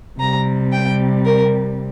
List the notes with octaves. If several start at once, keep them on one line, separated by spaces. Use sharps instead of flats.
C3 G3 A#5
G5
A#4